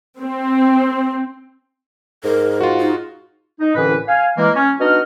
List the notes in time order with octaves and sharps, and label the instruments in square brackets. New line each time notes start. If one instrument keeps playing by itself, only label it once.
[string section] C4
[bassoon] G#2 [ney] A#4
[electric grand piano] F4 F#4
[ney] D#4
[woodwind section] D#4
C2 A2 D3 E3 C#4 B4
F5 G#5
E3 G#3 A#3
C#4
B3 D4 D#4 F#4 D#5 F6